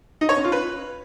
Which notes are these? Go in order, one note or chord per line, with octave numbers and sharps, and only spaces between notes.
D#4
C#5
C#4
F4
B4